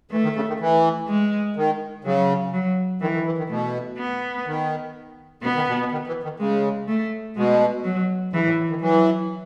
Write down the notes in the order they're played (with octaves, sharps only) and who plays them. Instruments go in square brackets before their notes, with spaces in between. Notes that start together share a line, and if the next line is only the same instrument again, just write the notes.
[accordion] E3 [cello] A3
[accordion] D#3
C#3
D#3
E3
[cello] G#3
[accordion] D#3
[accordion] C#3 [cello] F#3
[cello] F#3
[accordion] D#3 [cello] E3
[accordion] D#3
E3
D#3
[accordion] B2 [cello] A3
[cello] B3
[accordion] D#3
[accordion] B2 [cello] B3
[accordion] D#3
B2
B2
D#3
E3
D#3
[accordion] C#3 [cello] G#3
[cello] A3
[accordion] B2 [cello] G#3
[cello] F#3
[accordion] C#3 [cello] E3
[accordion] A2
A2
D#3
[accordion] E3 [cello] F#3